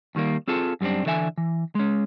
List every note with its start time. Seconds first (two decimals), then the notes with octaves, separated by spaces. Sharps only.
0.15 D#2 D#3 G3 A#3
0.48 C4 F4 G#4 A4
0.81 F#2 G3 A#3 C4 D4
1.06 D3 E3 A4 E5 F#5 G#5
1.38 E3
1.75 G#3 C#4